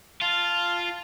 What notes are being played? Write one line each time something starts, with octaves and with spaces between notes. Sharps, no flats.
F4 F5 A5